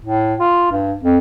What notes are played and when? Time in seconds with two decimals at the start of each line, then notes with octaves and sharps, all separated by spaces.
0.05 A2
0.40 F4
0.72 G2
1.03 F2